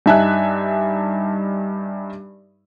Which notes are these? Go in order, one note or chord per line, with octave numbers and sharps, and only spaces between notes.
G2 D#4 E5 G#5 A5 F#6